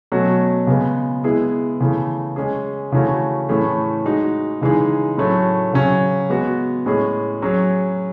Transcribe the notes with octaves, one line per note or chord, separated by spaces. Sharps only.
B2 F#3 A3 C#4 F#4
C#3 G#3 B3
G#3 B3 E4 G#4
C#3 E3 A3
G#3 C#4 G#4
C#3 E3 A3 C#4 F#4
A2 E3 A3 C#4 G#4
G#3 D#4 F#4
C#3 E3 G#3 D#4 G#4
A2 F#3 A3 C#4 F#4
C#3 F#3 C#4
G#3 B3 F#4
A2 G#3 C#4 G#4
F#3 C#4 G#4